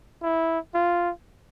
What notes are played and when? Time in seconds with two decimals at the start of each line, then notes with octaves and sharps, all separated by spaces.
0.23 E4
0.75 F4